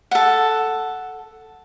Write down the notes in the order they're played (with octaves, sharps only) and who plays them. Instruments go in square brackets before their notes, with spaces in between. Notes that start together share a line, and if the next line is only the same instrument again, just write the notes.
[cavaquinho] A4 F#5